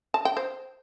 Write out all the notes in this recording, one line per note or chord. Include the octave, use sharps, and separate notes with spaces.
A5
G5
C5